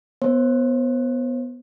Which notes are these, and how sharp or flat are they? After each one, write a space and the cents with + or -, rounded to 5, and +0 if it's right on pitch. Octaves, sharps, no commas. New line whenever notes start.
B3 +0 C5 +40